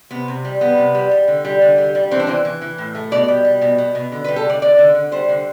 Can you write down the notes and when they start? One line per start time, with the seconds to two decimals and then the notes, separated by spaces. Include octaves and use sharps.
0.11 C3 B3
0.28 C3
0.45 G3
0.61 G3 B3
0.78 C3
0.95 G3
1.11 G3
1.28 D3
1.45 G3
1.62 D3
1.78 G3
1.95 G3
2.11 E3 C4
2.20 D4
2.27 E3 C4
2.45 E3
2.62 E3
2.78 A2
2.95 A3
3.12 B2 D5
3.28 G3
3.45 G3
3.61 B2
3.78 B2
3.95 B2
4.12 D3
4.24 B4
4.28 G3
4.36 A4
4.45 D3 D5
4.62 D3 D5
4.78 D3
4.95 D3
5.12 G3 C5
5.29 D3